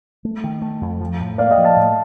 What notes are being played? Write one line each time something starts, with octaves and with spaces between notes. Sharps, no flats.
A3
D#3
A3
F2
F3
A2
A#3 D5 F5
D#5 G5
F3
F5 A5
A2